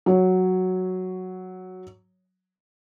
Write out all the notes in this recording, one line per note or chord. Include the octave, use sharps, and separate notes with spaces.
F#3 C#5